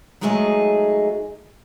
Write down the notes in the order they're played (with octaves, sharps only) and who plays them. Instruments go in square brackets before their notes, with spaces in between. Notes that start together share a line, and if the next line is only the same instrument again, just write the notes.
[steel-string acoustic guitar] F#3 G#3 A3 D#4 G#4 D#5